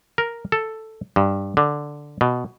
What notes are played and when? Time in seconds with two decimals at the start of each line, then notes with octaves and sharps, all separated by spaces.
0.18 A#4
0.52 A4
1.16 G2
1.57 D3
2.21 B2